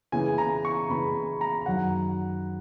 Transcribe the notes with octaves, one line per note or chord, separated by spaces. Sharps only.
C#3 E3 B3 G#5
A#5
C#6
C#3 E3 B3 B5
A#5
F#2 D#3 F#3 F#5